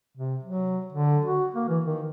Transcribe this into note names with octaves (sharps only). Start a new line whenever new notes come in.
C3
F#3
D3
F#4
A#3
E3
D#3